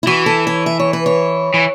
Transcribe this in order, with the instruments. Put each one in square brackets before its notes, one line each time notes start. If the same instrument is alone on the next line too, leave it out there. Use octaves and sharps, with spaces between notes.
[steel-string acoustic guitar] E4
[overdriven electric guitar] E3 [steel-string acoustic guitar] F#4
[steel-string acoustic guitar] A4
C#5
E5
C#5
B4
C#5
[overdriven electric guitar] E3